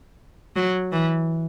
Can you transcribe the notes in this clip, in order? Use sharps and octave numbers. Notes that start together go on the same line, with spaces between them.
F#3
E3